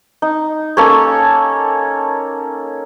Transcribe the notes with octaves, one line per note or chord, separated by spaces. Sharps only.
D#4
A#3 C#4 A4 C#5